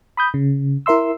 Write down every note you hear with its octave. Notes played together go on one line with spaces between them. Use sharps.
B5 D#6 G6
C#3
E4 A#4 E5 C6 E6